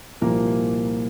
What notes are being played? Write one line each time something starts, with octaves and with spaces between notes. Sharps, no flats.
C2 A#2 F3 A#3 A#4